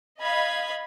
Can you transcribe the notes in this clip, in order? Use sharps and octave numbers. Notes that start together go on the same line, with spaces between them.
D#5 F5 B5 G#6